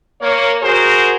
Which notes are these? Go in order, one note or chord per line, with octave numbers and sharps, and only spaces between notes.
A#3 C#5
F#4 G#4 A#4 C5